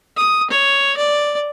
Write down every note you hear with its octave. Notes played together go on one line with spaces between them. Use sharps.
D#6
C#5
D5